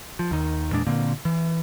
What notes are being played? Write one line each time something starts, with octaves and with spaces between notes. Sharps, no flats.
F3
D#2 D#3
E2 A#2 G#3 D4
A#2 D3 A#3 C4
E3